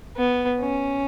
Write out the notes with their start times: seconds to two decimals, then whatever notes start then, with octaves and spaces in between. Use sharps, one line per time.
0.17 B3
0.60 C#4